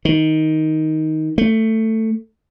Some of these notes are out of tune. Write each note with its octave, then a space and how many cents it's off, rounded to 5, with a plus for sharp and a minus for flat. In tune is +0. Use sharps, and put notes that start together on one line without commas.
D#3 +10
A3 +10